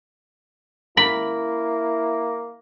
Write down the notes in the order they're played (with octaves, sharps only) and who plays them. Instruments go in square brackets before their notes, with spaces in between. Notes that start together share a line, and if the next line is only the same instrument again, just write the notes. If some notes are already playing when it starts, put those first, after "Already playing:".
[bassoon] A#3 [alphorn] E4 [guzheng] B5